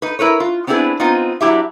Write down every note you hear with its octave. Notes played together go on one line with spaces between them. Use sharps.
D#4 B4
E4 A#4 B4 C#5
F4
B3 C4 D4 E4 G#4 B4
B3 C4 D#4 F4
F#3 D4 E4 G4 E5